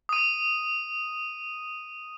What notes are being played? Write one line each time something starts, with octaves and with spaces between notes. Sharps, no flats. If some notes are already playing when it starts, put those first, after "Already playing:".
D#6 D#7